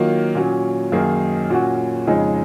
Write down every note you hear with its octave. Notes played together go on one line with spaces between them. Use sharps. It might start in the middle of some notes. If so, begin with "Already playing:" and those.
Already playing: D#3 F#3 A#3 F4
A#2 F#3 C#4
F#2 D#3 A#3 D#4 G#4
A#2 F#3 C#4 F#4
F2 C#3 G#3 D#4 G#4